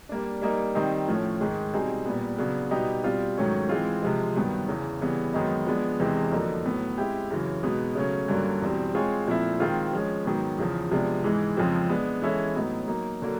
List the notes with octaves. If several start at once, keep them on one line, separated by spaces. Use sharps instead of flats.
G3 A#3 D4
G3 A#3 D#4
D#3 G3 C4 D#4
A2 F3 A3 C#4
G#2 D#3 G#3
B2 G3 C4 D#4 G#4
A#2 G3 B3
C#3 F#3 B3 D4
B2 G3 B3 D#4 G4
B2 G3 C4 F4
G#2 D#3 F#3 A3 C#4
E3 G#3 C4 F4
C3 F3 G#3
G2 D#3 F#3 B3
E2 C#3 E3
C#3 E3 G3 B3
F#2 D#3 G#3 B3 D#4
F3 G#3 B3 D4
E2 C3 E3 G#3 C4
F2 D3 F#3 A#3 D#4
A2 F#3 B3
G#3 C4 E4 G4
F#2 C#3 E3
B2 G#3 B3 D#4
C#3 F#3 A3 C#4
G2 D3 F#3 A#3 C#4
E2 B2 G3 C4
G#3 C4 F4 G#4 C#5
A#2 F3 A3 C4 E4
D#3 G#3 C4 F4
F3 G#3 C#4
G#2 D#3 F#3 B3
E2 C#3 F3
C3 F3 G#3 B3 D4
G#2 E3 G#3
F2 C#3 F3 G#3 C4
G#3 B3 D4
E3 G#3 C#4 E4 A4
A2 F#3 B3 D#4
F#3 A#3 D#4
D3 F#3 A#3